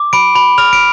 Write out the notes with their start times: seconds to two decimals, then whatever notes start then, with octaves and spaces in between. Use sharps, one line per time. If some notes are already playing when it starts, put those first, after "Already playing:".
Already playing: D6
0.13 B5 D7
0.35 B5
0.58 F6 F7
0.73 D7